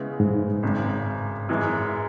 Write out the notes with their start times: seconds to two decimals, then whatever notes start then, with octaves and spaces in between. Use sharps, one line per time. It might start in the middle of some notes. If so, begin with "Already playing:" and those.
Already playing: C#3 G#3 B3 E4
0.20 G#2
0.63 G#1 F#2 C#3
1.49 F#2 E3 G#3